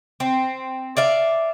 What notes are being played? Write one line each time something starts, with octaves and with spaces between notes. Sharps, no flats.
C4
D5 E5 F5